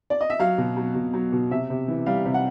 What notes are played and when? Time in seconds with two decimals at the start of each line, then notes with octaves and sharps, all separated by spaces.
0.10 D5
0.21 D#5
0.30 E5
0.39 F#3 F5
0.58 B2
0.77 F#3
0.95 B2
1.14 F#3
1.32 B2
1.51 C3 E5
1.70 C3
1.88 E3
2.06 G3 F5
2.26 C3
2.34 F#5